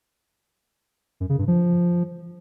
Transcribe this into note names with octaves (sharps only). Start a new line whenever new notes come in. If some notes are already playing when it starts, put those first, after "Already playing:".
F#2
C#3
G2
F3